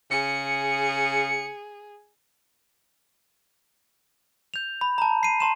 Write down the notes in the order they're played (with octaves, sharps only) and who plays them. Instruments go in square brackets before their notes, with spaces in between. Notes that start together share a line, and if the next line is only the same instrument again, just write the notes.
[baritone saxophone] C#3 [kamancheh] G#4 [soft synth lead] C#7
[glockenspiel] G6 F7
B5
A5 A#5
C7 D#7
A5 C6 E7